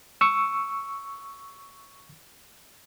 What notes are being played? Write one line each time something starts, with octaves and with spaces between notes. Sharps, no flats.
C#6 E6